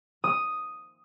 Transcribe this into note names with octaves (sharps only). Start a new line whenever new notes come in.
D#6